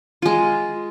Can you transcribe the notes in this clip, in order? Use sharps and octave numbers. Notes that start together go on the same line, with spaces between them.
G#3 F4